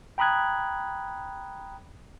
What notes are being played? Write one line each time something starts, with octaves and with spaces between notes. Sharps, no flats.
G5 A#5 B5 D#6 F#6 G#6